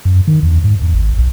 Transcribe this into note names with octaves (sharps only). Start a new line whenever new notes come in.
F#2
D#3
E2
G#2
E2
G#1
B1